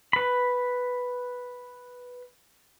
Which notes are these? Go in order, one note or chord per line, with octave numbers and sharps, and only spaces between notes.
B4 B5